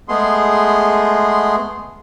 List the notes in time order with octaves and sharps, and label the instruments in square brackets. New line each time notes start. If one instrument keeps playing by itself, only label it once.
[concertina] G#3 A3 B3 G#4 C6